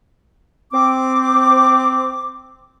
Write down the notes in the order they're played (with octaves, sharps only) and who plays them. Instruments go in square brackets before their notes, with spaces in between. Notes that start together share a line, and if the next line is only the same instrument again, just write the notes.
[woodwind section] C4 D6